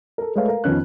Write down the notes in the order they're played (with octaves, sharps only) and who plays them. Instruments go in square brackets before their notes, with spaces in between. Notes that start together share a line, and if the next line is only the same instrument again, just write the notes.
[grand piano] A4 A#4
G#3 A3 B4 C#5 F5
A#4 F5
F2 D#3 B3 C#4 F#6